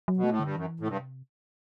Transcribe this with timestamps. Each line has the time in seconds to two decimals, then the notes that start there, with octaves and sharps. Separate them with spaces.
0.08 F#3
0.17 B2
0.24 A3
0.30 A2
0.40 G2 D3
0.56 F#2 E3
0.80 A2
0.88 G2 C3